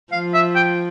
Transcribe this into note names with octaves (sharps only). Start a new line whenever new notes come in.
F3 F5
E5
G5